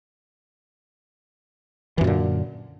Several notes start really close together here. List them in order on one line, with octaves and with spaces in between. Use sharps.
E3 F#2 A#2 D3